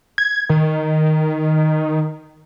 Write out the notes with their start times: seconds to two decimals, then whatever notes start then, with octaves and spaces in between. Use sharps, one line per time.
0.18 G#6
0.50 D#3